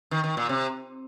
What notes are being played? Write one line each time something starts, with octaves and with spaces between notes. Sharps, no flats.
D#3
D#3
A#2
C3